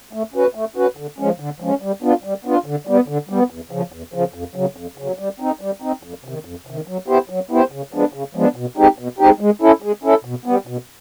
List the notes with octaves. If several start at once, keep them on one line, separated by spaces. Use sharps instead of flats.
A3
C#4 F#4 B4
A3
C#4 F#4 B4
D3
F3 G#3 C#4
D3
F3 G#3 C#4
G3
B3 D4 F4
G3
B3 D4 F4
D3
G3 B3
D3
G3 B3
E2
C#3 F3
E2
C#3 F3
F2
C#3 F#3
F2
C#3 F#3
G3
C4 D#4
G3
C4 D#4
F2
C3 D#3
F2
C3 D#3
F#3
B3 E4 G4 C5
F#3
B3 E4 G4 C5
C#3
F3 G#3 B3 D4
C#3
F3 G#3 B3 D4
B2
G#3 C4 D#4 G4
B2
G#3 C4 D#4 G4
G#3
C#4 E4 A4
G#3
C#4 E4 A4
B2
G3 B3
B2